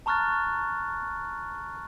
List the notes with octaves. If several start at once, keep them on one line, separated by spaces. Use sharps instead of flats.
A5 A#5 C#6 F6 F#6 A6